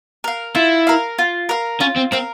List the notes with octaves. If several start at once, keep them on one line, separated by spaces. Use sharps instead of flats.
A#4 F5
E4 F4
A#4 F5
F4
A#4 F5
C#4 F4
C4
C4 A#4 F5